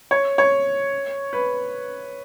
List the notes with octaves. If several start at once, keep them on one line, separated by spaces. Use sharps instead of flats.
C#5
C#5
B4